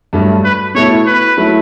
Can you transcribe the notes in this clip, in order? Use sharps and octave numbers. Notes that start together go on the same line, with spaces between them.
G2 F#3 A3
B4
B2 A3 E4 C#5
B4
F#3 A3 E4